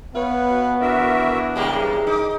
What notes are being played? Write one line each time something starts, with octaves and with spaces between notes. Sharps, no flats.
B3 B4 C#5 F5
B2
E3 D4 F#4 A#4 E5
C#3 G3 G#3 G4 A#4
D#4 D6